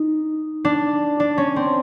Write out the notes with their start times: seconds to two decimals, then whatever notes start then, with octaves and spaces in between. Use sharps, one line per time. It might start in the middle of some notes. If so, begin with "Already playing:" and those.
Already playing: D#4
0.65 D4
1.20 D4
1.38 C#4
1.56 C4